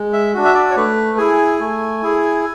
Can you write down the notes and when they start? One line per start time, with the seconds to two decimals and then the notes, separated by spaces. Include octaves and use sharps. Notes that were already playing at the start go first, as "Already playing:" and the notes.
Already playing: G#3
0.13 E5
0.34 D4 F#4
0.45 E5
0.54 D5
0.70 C#5
0.76 A3 B4
1.18 E4 G#4 G#5
1.60 A3
2.02 E4 G#4